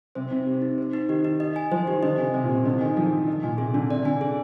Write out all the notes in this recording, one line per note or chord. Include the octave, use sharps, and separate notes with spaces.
C3 C5
C3 D#4
G4
D#4
C5
D#4
D#3 G4
D#4
D#5
G#5
F3 C5
D#3 G4
D3 D#5
C3 G#5
C3 C5
A#2
G4
C3
D3 D#5
D#3 G#5
F3 G#4
D4
D#5
A#2 G#5
C3 G#4
D3 D4
C3 D5
D3 G#5
G#4